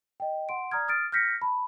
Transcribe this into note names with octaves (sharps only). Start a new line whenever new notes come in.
D#5 G5
F#5 C6 D7
D5 A#5 D#6 F6 G#6
D#6 F6 A6 D7
F6 G6 A#6 B6 C#7
A5 B5